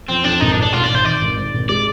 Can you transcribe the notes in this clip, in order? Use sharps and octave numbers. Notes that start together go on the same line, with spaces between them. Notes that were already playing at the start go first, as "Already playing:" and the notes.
F2 C4
F2 D4
G#1 D#4
D4
G#2
D4
G#1 F4
D5
G#1
C5
D#3 D5
G#1
G#2
G#1
G#3 D5